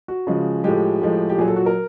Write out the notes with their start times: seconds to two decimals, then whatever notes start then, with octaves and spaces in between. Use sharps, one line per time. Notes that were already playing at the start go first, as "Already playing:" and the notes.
0.08 F#4
0.27 C#3 F3 G#3
0.64 A2 F3 G#3 G4
1.02 A2 F3 G#3
1.29 G4
1.38 A#2 F#3 G#4
1.48 A4
1.56 F#4
1.66 A#4